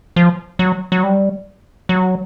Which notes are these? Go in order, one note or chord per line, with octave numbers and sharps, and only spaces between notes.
F3
F#3
F#3
G3
F#3